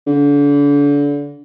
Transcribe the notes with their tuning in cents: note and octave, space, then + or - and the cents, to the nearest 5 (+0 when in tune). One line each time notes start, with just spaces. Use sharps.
D3 -35